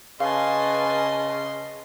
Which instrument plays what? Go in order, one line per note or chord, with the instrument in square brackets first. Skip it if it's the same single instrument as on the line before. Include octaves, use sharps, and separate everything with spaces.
[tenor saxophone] C#3 [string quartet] B4 G#5 A5 [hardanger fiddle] D#5 C6 [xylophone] F5